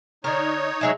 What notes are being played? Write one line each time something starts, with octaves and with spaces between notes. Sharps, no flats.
D3 D#4 A#4 C#5
F#3 G#3 A3